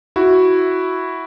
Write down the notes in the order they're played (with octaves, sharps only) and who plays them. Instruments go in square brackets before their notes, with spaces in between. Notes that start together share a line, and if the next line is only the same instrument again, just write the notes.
[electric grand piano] E4 F#4